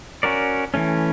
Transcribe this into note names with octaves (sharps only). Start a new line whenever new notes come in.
C#4 F#4 A#4 D5
E3 A3 C#4